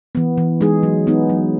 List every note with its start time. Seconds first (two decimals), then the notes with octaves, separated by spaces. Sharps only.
0.15 E3 B3
0.38 E3
0.61 G#3 D#4 G#4
0.83 F#3
1.07 B3 D#4
1.29 F#3